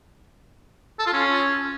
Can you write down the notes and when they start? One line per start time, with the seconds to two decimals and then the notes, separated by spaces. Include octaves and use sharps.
0.99 A4
1.06 F4
1.13 C#4